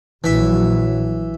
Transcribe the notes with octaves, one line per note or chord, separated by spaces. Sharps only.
A#1 E3 F#3 E5